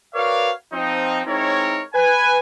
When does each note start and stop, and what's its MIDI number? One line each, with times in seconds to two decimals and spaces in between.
0.15 0.51 66
0.15 0.51 70
0.15 0.51 71
0.15 0.51 73
0.15 0.51 74
0.15 0.51 77
0.73 1.21 53
0.73 1.21 60
0.73 1.21 63
1.26 1.81 56
1.26 1.81 60
1.26 1.81 63
1.26 1.81 64
1.26 1.81 70
1.26 1.81 73
1.94 2.39 71
1.94 2.39 80